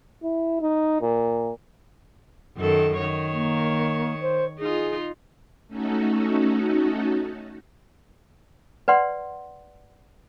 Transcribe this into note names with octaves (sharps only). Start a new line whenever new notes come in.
E4
D#4
A#2
F#2 D#3 A4
D#3 C#5
A#3
C5
D#4 F4 G#4
A3 C#4 D#4 F#4 A4
B4 D5 F#5 C6